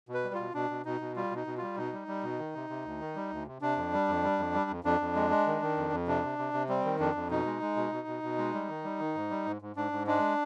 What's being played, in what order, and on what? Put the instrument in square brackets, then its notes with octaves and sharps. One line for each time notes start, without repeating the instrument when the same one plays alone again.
[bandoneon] B2
B4
G3
B2 F4
B2 D4
B2
B2 D#4
B2
G3 F4
B2
D#4
B2
G3 F4
B2 D#4
G3
G3
B2
D#3
C3
C3
D2
D#3
G3
D2
C3
C3 D4
F2
G3
F2
G3
F2
G3
F2
F2 D4
F2
G#3
G#3
D#3
D#3
F2
F2
C3 D4
C3
C3
C3
G3 C4
D#3
F2 D4
F2
B2 D#4
G#3
G#3
B2
B2
B2
B2
G#3
G3
D#3
G3
D#3
G#2
G3
G#2
G#2
G#2 D4
G#2
G#3 D4